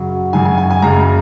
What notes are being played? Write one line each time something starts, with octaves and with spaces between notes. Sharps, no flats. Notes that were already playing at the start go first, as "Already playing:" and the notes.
Already playing: F#2 C#3 F#3
F#2 C#3 F#3 G#5
G#5
G#5
G#5
F#1 F#2 C#3 A#5